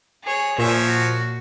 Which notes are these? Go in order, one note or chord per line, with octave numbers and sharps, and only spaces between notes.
G#4 C#5
A#2 F3 C#5 E5
F#4